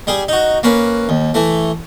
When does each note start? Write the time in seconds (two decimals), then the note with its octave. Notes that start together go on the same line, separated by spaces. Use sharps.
0.07 G3 G#4
0.28 D#4 F#4
0.63 A#3 C#4 B4
1.09 D#2
1.34 E3 A3